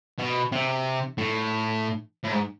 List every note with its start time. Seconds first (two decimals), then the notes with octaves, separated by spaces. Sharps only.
0.19 B2
0.52 C3
1.18 A2
2.24 A2
2.32 G#2